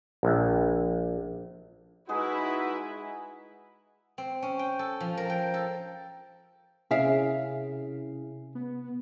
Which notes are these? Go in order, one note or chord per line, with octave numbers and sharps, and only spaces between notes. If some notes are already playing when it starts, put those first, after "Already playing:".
A#1
G#3 D#4 E4 F#4 G#4 B4 F#5
C4
C#4
G5
A4
F3
A#4
G5
A4
C3 C#4 E4 G#4 A#4 E5 F5
B3